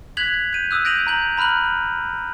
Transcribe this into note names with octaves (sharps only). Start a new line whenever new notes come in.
F#6 G#6 B6 F7 F#7
G6 D#7
D#6 E6 F#6
G6 A#6 D7 D#7 F7 F#7
A#5 G6 F#7
A#5 B5 F6 F#6 F#7